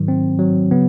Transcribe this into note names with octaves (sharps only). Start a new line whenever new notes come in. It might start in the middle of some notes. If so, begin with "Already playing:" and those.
Already playing: G#2 D#3 F#3
C4
F#3
C#3 F#3 B3